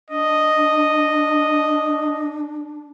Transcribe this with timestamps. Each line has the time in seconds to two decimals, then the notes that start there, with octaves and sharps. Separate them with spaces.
0.10 D4 D#5